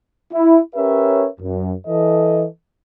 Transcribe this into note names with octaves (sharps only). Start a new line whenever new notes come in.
E4
C#4 G4 A#4 B4 C#5 E5
F#2
E3 A4 D#5